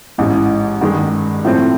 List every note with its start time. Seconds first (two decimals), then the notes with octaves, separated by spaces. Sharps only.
0.18 A1 G#2 E3
0.81 G2 D#3 G#3
1.44 A2 F3 A3 C4